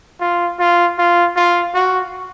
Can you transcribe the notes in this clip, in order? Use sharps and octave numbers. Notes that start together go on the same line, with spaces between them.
F4
F4
F4
F4
F#4